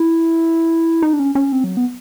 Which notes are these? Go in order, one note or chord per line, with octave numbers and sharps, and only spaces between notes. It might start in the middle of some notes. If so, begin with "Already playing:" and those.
Already playing: E4
D#4
D4
C#4
C#4
C4
F#3
B3